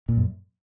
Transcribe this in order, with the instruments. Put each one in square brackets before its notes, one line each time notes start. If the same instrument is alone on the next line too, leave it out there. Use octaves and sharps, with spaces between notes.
[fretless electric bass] A#2
F#2